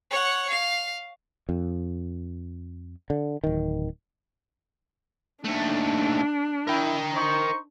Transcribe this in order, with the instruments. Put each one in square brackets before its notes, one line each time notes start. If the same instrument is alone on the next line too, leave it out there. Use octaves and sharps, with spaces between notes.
[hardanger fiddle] C#5 F#5
F5
[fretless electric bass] F2
D3
D1 D#3
[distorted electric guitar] D#2 A3 [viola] D4
[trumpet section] E4 [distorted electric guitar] A#4 G5
[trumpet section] D#4 C5 C#6